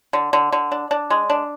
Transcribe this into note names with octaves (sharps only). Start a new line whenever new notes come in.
D3
D3
D3
D4
D4
G#3
D4